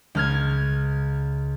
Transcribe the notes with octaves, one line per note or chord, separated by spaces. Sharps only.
C#2 F6 G#6